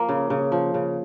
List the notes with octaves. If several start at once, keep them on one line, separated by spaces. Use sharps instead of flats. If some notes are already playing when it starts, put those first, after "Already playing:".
Already playing: F3 A#3
C#3
C#3
F3
C#3